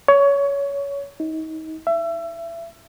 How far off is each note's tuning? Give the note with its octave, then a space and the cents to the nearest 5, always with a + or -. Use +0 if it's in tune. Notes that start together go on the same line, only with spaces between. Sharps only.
C#5 +20
D#4 +30
E5 +30